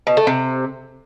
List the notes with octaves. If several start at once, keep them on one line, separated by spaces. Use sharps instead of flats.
B2
A3
C3